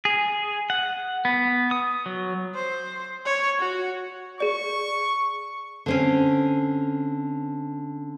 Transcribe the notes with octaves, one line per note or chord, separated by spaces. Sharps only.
G#4
F#5
B3
D#6
F#3
C5
C#5
F#4
G#4 D5 C#6
D3 C4 C#4